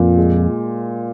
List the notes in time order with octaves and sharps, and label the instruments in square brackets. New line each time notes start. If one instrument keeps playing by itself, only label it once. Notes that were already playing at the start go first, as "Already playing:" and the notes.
Already playing: [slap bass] F2 [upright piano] A#2
[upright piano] G#3